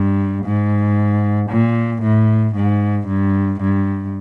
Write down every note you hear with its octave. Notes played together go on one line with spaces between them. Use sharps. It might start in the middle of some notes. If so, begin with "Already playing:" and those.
Already playing: G2
G#2
A#2
A2
G#2
G2
G2